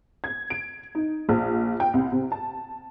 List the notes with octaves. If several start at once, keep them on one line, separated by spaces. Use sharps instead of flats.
G#6
D7
D#4
A#1
G5
C2
C3
A5